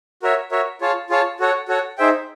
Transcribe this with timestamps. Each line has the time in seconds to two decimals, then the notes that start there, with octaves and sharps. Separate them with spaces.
0.22 F#4 A#4 C#5 E5
0.51 F#4 A#4 C#5 E5
0.81 F4 G#4 C#5 F5 A5
1.10 F4 G#4 C#5 F5 A5
1.40 F#4 A4 C#5 F#5
1.68 F#4 A4 C#5 F#5
1.98 D#4 G#4 C5 E5 G5